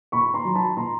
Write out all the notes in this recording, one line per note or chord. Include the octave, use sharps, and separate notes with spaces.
A#2 B5 C#6
A#5 C6
F#3
A5 B5
A#2 A#5 C6